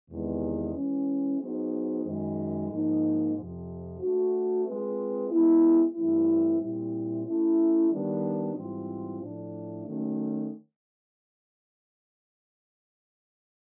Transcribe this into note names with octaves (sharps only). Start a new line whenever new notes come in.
E2 C3 D#3 G#3 B3
E3 G#3 C#4
F#3 B3 D#4 G#4 C5
F#2 D#3 G#3
G#2 F3 A#3 D#4
F2 C3 F3
A3 D4 F#4
G#3 C4 F4 G#4 B4
G#3 B3 E4
G2 E3 A3 C4 E4
A#2 G3 C4 E4
A3 C#4 E4
D#3 G3 B3 D4
G#2 E3 G3 C4 F4
A2 F3 A3 D4
D#3 F#3 A3 C#4